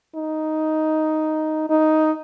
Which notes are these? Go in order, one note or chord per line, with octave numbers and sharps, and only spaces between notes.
D#4
D#4